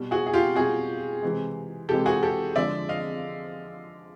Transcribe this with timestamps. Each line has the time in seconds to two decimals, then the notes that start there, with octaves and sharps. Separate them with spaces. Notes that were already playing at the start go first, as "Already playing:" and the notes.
Already playing: B2 G3
0.11 F#4 G#4
0.26 G#4
0.33 F4 G4
0.56 B2 G3 F#4 G#4
1.22 C3 E3 G#3
1.89 C3 E3 G#3 G4 A4
2.06 F#4 G#4
2.23 G4 A4
2.56 D3 F3 G#3 D5 E5
2.89 D#5 F5